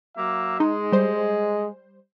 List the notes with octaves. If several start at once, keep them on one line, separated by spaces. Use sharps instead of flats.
F#3 A#3 E5
G#3 D#4
G3 C5